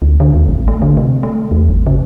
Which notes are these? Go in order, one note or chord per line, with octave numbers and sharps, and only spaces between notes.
D2
D3
D#2
A1
A3
D3
C3
A3
E2
G#1
C#3